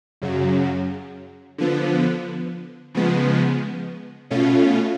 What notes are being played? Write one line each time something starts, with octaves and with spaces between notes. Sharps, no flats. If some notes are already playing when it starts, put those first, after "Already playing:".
F#2 C#3 F#3
D3 F3 B3
C#3 F3 G#3 B3
B2 A3 C#4 F4